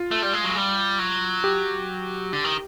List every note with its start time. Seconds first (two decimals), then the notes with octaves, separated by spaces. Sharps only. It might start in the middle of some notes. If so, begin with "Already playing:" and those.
Already playing: F4
0.11 A3
0.22 G3
0.33 G#3
0.44 F#3
0.56 G3
0.99 F#3
1.44 G4
2.33 D3
2.44 D#3